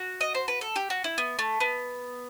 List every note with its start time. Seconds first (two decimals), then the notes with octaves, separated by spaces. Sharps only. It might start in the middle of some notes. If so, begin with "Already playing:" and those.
Already playing: F#4
0.21 D#5
0.35 C5
0.48 B4
0.61 A4
0.76 G4
0.90 F#4
1.04 E4
1.18 B3
1.39 A3
1.60 B3